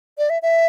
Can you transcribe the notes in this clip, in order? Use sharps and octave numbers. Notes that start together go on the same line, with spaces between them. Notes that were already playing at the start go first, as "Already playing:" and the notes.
D5
E5
E5